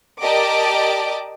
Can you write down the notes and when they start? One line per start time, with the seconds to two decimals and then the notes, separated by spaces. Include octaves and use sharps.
0.22 G4 A#4 D5 D#5 A5 D6